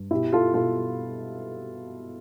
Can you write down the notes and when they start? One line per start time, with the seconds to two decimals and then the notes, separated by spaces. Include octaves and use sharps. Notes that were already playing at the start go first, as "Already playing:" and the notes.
Already playing: G2
0.11 B2 E4 G4
0.33 F4 A4
0.54 B2 F4 A4